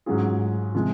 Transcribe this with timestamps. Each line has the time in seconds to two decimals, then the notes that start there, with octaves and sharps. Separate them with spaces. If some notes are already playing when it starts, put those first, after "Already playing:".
0.06 G#2 F#3 C#4 F4 G#4
0.75 C3 F3 G#3